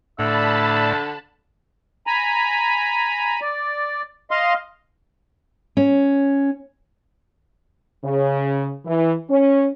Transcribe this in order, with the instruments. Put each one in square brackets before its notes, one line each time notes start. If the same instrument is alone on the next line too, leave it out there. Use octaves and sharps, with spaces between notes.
[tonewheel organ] A2 D5 [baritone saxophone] D3 [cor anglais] E5 [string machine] A5 B5
[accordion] G#5 A#5 B5
D5
D#5 F5 C6
[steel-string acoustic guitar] C#4
[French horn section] C#3
E3
C#4